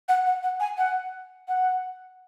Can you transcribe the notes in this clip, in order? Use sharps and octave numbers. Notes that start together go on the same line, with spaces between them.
F#5
F#5
F#5
G#5
F#5
F#5